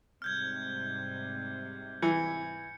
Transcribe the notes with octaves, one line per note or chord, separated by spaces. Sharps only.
G#2 C3 G3 F6 G6 G#6
E3 C#7